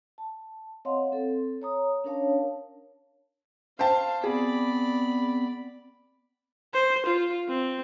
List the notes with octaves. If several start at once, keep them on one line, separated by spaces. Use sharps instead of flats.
A5
C4 C#5 D#5 F5 F#5 C6
C4 A4
C#5 A#5 D#6
C#4 D4 A#4 C#5 F5 A5
C5 F5 G5 A5
B3 C4 G#4 D5 B5
C5
F4
C4